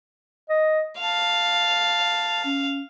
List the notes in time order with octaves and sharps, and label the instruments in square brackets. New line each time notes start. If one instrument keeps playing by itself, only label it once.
[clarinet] D#5
[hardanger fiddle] F5 [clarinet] A5
[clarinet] C#4